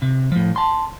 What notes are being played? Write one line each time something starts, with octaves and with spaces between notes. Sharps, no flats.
C3
A2 F3
A5 C6